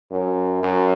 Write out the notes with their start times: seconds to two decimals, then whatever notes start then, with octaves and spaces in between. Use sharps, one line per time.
0.11 F#2
0.63 F#2